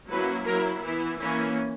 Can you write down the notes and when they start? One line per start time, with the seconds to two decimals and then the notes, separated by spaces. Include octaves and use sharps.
0.11 F#3 A#3 C#4 E4 B4
0.47 F#3 A#3 E4 A#4
0.84 E3 B3 E4
1.20 E3 A#3 C#4 E4